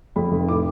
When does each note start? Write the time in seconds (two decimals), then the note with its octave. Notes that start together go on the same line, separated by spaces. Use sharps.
0.16 F2 B5
0.32 F1
0.48 A2 D6